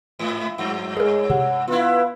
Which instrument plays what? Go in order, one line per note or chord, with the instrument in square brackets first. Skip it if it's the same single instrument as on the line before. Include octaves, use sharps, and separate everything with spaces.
[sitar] G#2
[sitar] G2 [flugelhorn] F#3
[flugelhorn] G#3 [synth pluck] G#4 A#4 [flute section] C#5
[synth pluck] C3 [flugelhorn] F#5
[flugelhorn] B3 [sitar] E4 F4 [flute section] B4 F5